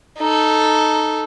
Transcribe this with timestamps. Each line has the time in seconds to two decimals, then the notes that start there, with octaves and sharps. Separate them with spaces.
0.18 D#4 A4